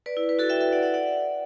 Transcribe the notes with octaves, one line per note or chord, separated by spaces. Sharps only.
B4 D5
E4
B4
F#4 A4
E5 G5
E5 G5
D5 F#5
D5 F#5
D5 F#5